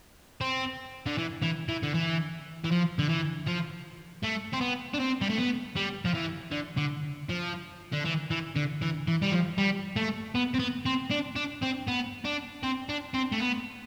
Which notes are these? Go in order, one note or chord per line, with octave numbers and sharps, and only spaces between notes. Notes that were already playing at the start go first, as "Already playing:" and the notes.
C4
D3
E3
E3
E3
D3
E3
E3
F3
D3
E3
F3
A3
C4
B3
D4
C4
G3
A3
B3
G3
F3
E3
D3
D3
F3
D3
E3
E3
D3
E3
E3
G3
F3
G3
A3
B3
C4
B3
C4
D4
D4
C4
B3
D4
C4
D4
C4
A3
B3